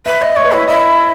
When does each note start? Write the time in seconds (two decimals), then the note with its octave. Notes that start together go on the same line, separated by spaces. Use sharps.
0.06 B4 E5
0.21 D#5 E5
0.36 C#5 D#5
0.45 B4
0.52 E4 C#5
0.68 E4 D#5